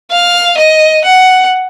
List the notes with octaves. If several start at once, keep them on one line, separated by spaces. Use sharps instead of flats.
F5
D#5
F#5